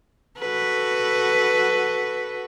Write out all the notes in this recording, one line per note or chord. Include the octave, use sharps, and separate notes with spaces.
F#4 A4 B4